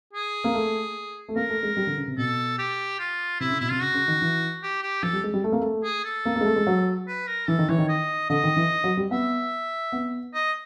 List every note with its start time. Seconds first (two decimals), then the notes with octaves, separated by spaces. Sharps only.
0.13 G#4
0.44 A#3
0.54 A3
1.28 A3
1.36 A#3 A#4
1.50 A3
1.63 G#3
1.77 G3
1.87 D3
1.98 C#3
2.08 C3
2.17 B2 A4
2.59 G4
3.00 F4
3.40 C3 E4
3.50 C#3
3.60 B2 E4
3.71 C3 F4
3.80 C#3 F#4
3.94 C#3
4.08 D#3
4.22 E3
4.63 G4
4.82 G4
5.03 F3 A4
5.13 G3
5.24 G#3
5.34 G3
5.44 A3
5.52 A#3
5.61 A3
5.84 G#4
6.05 A4
6.25 A#3
6.36 A#3
6.41 G#3
6.46 A3
6.56 G#3
6.67 F#3
7.08 B4
7.27 A#4
7.48 E3 A4
7.59 D#3
7.69 E3 C#5
7.78 D#3
7.89 D#5
8.30 D3 D#5
8.44 D#3
8.56 E3
8.84 F#3
8.97 G3
9.11 B3 E5
9.92 B3
10.34 D#5